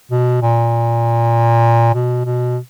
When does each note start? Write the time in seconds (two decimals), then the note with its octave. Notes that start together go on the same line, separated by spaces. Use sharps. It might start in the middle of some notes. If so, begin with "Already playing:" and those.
0.11 B2
0.42 A#2
1.94 B2
2.25 B2